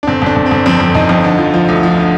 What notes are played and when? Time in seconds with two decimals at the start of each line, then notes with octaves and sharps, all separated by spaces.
0.03 D4
0.07 G1 C4
0.22 G1 D4
0.36 G1
0.46 C4
0.51 G1
0.66 F2 C4
0.80 F2
0.95 G1 D#4
1.09 F2
1.24 D3
1.38 F3
1.54 F3
1.68 D2
1.83 F3
1.97 D3